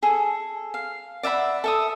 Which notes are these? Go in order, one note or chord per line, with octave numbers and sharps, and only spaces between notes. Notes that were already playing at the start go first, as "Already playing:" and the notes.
G#4 A4
F5
D5 E5 F#5 B5
A4 E5 D#6